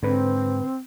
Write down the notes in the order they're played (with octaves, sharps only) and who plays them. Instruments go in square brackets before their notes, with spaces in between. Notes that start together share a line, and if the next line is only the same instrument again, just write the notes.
[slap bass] G#2 [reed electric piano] D3 B4 [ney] C4